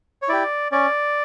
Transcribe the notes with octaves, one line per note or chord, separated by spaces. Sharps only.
C#5
E4 G4 D5
C#4 D5